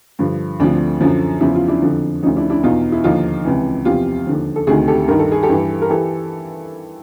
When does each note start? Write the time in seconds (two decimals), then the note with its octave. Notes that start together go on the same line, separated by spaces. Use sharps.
0.19 G2 D3 F3
0.60 D2 D3 F3 C4 D4
1.01 F#2 D3 F3
1.41 E2 C#3 F3 E4
1.55 F4
1.68 D4 E4
1.82 F2 D3 F3
2.23 D2 C#3 F3 C#4 D#4
2.36 D4 E4
2.50 D4 E4
2.63 E2 B2 D#4 F4
2.92 E4
3.04 D#2 D3 F3 D#4 F4
3.45 C#2 C3 E3
3.85 E2 C3 F3 F4 G4
4.26 D#2 D3 F3
4.56 A4
4.67 D2 C3 D#3 F#4 G#4
4.88 G4 A4
5.08 G2 D#3 A#4
5.19 A4
5.32 G#4
5.43 G4 A4
5.49 G2 E3
5.82 A#4
5.89 E3 G4 A4